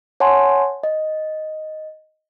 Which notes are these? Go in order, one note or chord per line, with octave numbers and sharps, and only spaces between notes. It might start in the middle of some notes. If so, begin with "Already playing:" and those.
C#5 F#5 G#5 A5 C6
D#5